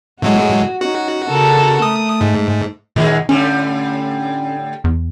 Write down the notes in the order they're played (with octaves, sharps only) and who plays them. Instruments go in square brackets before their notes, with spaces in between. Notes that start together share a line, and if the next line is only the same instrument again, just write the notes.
[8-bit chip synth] A2 F#3 G#3 [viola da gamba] F#4
[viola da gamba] C#4 D#4 [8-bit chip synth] F#4
[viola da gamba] C#3 A4 A#4
[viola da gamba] A3 [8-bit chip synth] D#6
[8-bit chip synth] G#2
[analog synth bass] A#2 [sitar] D#3 F#3 G#3
[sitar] A2 D3 G3 [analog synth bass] C#4
[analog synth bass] E2